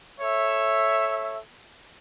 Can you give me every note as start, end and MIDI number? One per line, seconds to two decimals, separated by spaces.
0.20 1.39 69
0.20 1.39 73
0.20 1.39 76